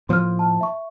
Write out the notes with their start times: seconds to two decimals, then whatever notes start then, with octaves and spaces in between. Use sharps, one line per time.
0.09 A2 F3 A#3 C6 F6
0.39 A5
0.61 E5 C#6